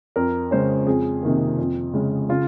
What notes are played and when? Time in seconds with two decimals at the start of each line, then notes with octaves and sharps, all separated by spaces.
0.16 F2 A#4
0.51 C#3 G#3 C#4 C5
0.87 F2 G#4
1.23 C3 D#3 A#3
1.59 F2
1.93 C#3 G#3 C#4
2.29 C#3 F4